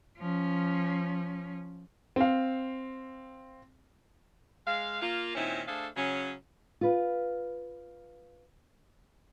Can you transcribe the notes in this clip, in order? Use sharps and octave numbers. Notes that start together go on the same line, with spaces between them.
F3 C#4
C4 F5
G#3 F5
A#3 F4
A#2 D#3 C4 C#4 D#4 E4
A3 D4 G#4 A4 C5 F5
C#3 F#3 C#4
F4 B4